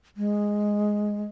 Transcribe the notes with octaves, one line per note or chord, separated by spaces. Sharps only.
G#3